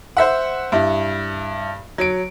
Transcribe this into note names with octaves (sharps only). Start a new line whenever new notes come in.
C5 E5 F#5
G2 E4
F#3 D7